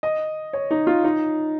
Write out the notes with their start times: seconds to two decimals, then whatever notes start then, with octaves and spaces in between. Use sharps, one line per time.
0.03 D#5
0.53 C#5
0.71 D#4
0.87 F4
1.04 D#4